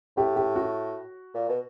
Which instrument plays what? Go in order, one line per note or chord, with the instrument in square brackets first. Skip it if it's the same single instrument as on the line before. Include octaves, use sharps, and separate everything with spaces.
[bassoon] A2 [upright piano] G4
[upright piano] G4
F#4
[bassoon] A#2
B2